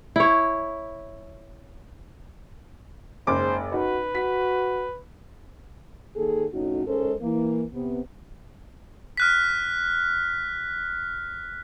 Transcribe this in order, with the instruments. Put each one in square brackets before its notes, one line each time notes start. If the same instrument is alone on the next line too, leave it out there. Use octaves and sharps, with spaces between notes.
[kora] E4 C#5
[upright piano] F#1 D6 [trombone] G#2 [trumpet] C5
[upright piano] D#4 [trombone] F#4 [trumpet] B4
[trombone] F#4 [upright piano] B6
[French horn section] D#2 D#3 A#3 G#4 A4
F2 A2 C#4 D#4 F#4
G#2 G#3 C#4 A4 A#4 C5
E3 A#3
C3 B3
[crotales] F6 F#6 B6